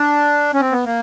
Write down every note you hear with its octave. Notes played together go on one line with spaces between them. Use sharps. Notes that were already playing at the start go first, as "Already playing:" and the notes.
Already playing: D4
C#4
C4
B3
A#3